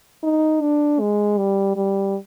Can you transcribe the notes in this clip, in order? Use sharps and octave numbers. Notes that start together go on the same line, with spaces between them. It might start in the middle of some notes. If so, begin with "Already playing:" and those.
D#4
D4
G#3
G3
G3